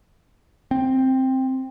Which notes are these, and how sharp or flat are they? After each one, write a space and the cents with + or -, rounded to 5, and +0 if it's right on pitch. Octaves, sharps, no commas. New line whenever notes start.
C4 +5